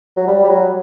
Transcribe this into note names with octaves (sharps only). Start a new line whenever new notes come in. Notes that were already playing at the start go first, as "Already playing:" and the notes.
F#3
G3
G3
F#3